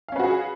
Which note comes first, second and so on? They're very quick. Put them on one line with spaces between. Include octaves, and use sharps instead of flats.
F5 C#4 B4 F#4 G#4